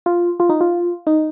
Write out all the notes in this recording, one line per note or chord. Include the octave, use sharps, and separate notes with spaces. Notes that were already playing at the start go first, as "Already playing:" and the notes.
F4
F4
D#4
F4
D#4